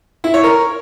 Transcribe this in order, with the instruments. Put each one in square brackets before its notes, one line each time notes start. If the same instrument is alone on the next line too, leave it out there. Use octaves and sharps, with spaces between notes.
[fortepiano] E4
C#5
A#4